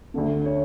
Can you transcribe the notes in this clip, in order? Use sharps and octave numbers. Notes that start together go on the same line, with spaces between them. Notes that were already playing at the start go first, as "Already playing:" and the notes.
D2 D3 A3
C#5